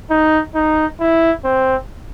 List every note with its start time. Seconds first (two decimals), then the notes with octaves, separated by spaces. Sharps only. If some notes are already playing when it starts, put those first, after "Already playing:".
0.10 D#4
0.55 D#4
1.00 E4
1.44 C4